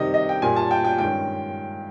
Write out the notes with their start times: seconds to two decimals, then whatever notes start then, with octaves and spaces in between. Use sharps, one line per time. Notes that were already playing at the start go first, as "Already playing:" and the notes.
Already playing: C3 D#3 G3 D#5
0.14 D#5
0.29 G5
0.42 A#2 G3 A#3 G#5
0.56 A5
0.71 G5
0.85 G5
0.98 G2 D#3 G#3 C#4 G5